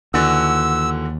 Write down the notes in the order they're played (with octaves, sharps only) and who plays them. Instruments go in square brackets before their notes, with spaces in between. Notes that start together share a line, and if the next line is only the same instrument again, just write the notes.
[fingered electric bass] D#2 [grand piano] D3 E3 F#4 [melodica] E6